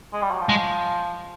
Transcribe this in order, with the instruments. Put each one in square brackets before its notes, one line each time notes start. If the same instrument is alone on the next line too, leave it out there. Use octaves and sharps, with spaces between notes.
[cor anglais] G#3
G3
F#3
F3
[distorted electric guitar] G#3